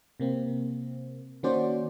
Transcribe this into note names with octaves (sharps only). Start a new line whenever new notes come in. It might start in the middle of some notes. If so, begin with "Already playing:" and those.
C3 A#3 C4
D#3 A#3 C#4 F#4 C5 D5